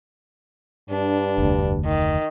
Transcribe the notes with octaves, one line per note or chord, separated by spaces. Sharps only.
G2 D4
F1 D2
D#3